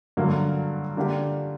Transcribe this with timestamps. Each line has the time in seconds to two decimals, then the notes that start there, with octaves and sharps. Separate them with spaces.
0.17 G2 D3 F#3 A#3
0.97 D3 A#3 D4 G4